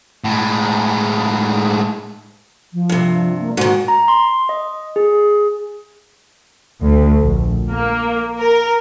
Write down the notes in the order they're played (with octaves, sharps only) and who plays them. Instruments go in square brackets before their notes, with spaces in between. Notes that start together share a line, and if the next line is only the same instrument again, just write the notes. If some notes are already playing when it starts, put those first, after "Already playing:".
[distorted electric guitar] A2 G#3
[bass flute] F3
[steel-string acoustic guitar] G2 C3
[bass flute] A#3
[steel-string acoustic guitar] G#2 D#3 [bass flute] F#4
[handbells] A#5
C6
D#5
G#4
[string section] D2
A#1
A#3
A#4